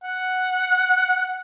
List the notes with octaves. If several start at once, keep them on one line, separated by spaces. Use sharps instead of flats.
F#5